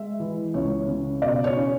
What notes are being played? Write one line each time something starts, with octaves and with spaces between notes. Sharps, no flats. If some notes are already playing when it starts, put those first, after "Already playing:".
Already playing: G#3 E5
E3
C#2 C#5
C#3
B2 D5
C#5
C#4